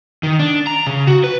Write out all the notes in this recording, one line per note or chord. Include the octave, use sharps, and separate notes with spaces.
D#3
D4
A#5
C#3
F#4
B4